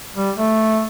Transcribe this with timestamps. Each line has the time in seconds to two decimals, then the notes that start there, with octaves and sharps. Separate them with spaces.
0.16 G3
0.38 A3